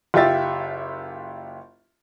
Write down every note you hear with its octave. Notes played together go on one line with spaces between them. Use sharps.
F#1 F4 G4 E5 A6